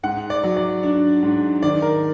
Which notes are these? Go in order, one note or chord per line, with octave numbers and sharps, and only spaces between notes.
G#2 F#5
D5
F#3
D5
D4
G#2
D#3 D5
A#4